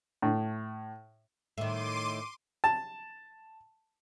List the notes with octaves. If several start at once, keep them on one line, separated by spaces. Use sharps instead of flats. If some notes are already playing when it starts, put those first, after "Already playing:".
A2
A2 D#3 C6 D6 D#7
A5